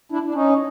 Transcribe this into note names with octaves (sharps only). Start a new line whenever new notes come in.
D4 E4
D4
C#4 D#4